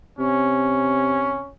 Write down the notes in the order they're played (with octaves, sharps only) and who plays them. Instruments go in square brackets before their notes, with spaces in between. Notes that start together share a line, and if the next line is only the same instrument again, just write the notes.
[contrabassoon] C3 [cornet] C#4